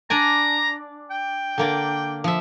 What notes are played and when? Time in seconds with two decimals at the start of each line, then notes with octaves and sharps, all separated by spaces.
0.10 D4 D5 G#5 A#5
1.11 G5
1.58 D3 A#3 D5
2.24 F3 E5